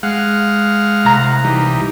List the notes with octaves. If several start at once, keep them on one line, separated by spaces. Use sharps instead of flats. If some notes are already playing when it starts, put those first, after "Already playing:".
G#3 F5 F#5
C2 A#5
E3 G3 D#4